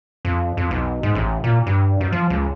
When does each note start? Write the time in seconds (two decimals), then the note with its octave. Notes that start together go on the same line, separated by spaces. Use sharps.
0.25 F2
0.57 F2
0.71 B1
1.03 G#2
1.15 A1
1.44 A#2
1.66 G2
2.01 F#2
2.12 F3
2.30 C#2